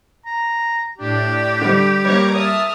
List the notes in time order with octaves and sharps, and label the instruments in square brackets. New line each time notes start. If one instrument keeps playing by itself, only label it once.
[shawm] A#5
[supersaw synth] A2 D4 [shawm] G4
[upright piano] D3 G3
[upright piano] G3 A#3 [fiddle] C#5 [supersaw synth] A#5 D6 G#6
[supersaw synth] E5 A5 [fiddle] D#6 F6